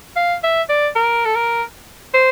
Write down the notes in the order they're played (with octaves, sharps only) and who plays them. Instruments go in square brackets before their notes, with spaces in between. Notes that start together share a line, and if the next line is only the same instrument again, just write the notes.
[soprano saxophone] F5
E5
D5
A#4
A4
A#4
C5